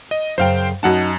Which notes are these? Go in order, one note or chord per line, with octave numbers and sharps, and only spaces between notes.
D#5
F#2 C#3 C5 F5 G5
F#2 D#4 F#4 D#5 F#5 A5